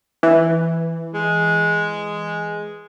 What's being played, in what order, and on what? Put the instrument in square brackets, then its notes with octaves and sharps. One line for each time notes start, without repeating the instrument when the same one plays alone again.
[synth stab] E3
[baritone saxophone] G#3